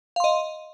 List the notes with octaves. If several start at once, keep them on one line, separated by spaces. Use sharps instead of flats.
D#5 F5 C6